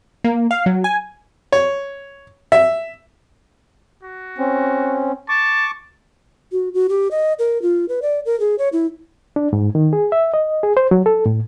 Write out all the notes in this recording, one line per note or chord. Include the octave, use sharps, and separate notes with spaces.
A#3
F5
F#3
G#5
C#5
E5
F#4
C4 C#4
A5 C#6 D6
F#4
F#4
G4
D#5
A#4
F4
B4
D5
A#4
G#4
C#5
E4
D4
G#2
D#3
G#4
E5
D#5
G#4
C5
F#3
A4
A2